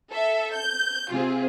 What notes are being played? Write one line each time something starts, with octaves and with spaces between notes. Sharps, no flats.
A4 E5
G6
C3 C4 F4 G#4